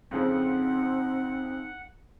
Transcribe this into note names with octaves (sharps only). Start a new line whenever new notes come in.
F2 C#3 F3 C4 D#4 F#5